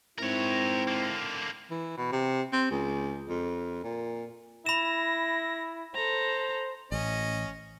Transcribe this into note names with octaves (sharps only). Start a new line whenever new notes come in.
G#2 C4 E4 A#4 C#5
D3 A#3
E3
B2
C3
C4
C#2
F2
A#2
E4 B5 A#6 E7
A4 C5 A#5
A1 C#4 D#5